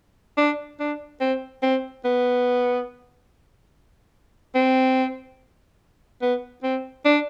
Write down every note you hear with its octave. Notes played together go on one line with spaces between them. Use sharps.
D4
D4
C4
C4
B3
C4
B3
C4
D4